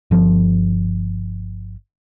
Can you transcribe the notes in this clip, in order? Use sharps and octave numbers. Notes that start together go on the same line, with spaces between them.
G1 F3